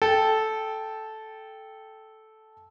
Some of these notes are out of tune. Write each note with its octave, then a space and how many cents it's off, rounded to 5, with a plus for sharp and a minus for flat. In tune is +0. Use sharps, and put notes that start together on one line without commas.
A4 -10 G5 +0